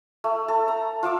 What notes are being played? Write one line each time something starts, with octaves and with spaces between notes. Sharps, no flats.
A3
A4
A#5
F4 E5 D6 E6